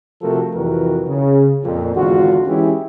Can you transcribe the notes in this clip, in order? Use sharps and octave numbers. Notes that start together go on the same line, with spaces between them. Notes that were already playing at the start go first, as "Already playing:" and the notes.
C3 F3 A3 F#4 A4 A#4
C2 F2 E3 F#4 A#4 B4
C#3
F2 A#2
G#1 E2 D3 F4 F#4
E3 G#3 C#4 E4 G4 G#4